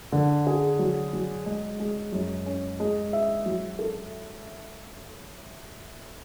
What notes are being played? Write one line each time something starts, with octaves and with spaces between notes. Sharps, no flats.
D3
G#4
F#3
F#3
G#3
G#3
F#2
C#4
G#3
E5
F#3
A4